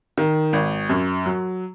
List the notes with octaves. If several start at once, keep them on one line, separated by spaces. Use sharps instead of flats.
D#3
G#1
F#2
F#3